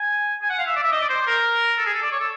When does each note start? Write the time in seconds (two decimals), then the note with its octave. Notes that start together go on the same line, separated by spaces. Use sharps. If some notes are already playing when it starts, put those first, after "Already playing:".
Already playing: G#5
0.42 G#5
0.49 F#5
0.58 F5
0.66 E5
0.76 D5
0.83 E5
0.92 D#5
1.01 D5
1.09 C5
1.27 A#4
1.78 A4
1.86 G#4
1.94 A4
2.02 D5
2.12 C#5
2.19 A4